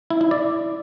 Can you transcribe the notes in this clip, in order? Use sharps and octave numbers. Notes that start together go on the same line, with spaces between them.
E4
E4
D5